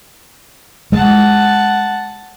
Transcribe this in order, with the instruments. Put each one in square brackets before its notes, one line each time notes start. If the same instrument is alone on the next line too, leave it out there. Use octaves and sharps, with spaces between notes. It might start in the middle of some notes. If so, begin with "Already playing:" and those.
[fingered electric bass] G#3 [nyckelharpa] F#5 A5